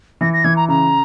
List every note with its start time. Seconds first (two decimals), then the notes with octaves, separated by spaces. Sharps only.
0.21 E3 A#6
0.33 A#6
0.44 E3 G#6
0.56 A#5
0.68 C#3 A#5